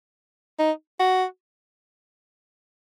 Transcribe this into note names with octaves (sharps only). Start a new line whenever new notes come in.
D#4
F#4